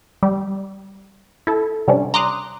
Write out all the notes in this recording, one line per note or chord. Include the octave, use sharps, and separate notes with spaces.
G3
E4 A4
C3 G3 C#4 D4
A#5 C6 D6 D#6 F#6